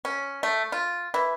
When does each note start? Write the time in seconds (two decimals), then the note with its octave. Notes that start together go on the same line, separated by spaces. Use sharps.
0.05 C#4
0.43 A3
0.72 F4
1.14 E3